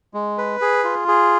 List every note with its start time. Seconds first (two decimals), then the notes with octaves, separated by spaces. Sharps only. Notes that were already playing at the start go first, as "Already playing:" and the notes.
0.14 G#3
0.38 B4
0.62 G#4
0.84 F4
1.08 G#4